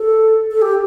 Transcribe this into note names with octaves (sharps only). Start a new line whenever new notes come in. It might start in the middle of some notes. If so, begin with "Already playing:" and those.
Already playing: A4
A4
G4